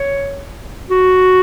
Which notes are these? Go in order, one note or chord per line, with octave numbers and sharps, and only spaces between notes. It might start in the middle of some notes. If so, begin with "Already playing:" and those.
Already playing: C#5
F#4